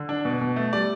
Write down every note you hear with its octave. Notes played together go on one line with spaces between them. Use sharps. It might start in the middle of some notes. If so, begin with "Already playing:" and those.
Already playing: D3
D4
B2
B2
A3
G3 D5